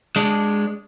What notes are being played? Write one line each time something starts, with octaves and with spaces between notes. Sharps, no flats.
G#3 D4